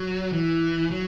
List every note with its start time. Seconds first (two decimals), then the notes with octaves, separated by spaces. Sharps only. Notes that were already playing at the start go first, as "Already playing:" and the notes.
Already playing: F#3
0.33 E3
0.91 F#3